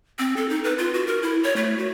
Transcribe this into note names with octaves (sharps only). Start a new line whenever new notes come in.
C4
A4
D#4
B4
F4
F#4
A#4
E4
C#5
A3
F#4